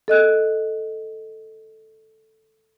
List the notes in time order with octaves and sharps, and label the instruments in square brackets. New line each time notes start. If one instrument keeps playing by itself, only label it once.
[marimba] A4 D#5 F#6